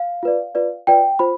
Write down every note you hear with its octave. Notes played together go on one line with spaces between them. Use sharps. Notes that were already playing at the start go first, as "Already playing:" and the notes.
Already playing: F5
F4 B4 D5
F4 B4 D5
F4 B4 D5 G5
F4 C5 B5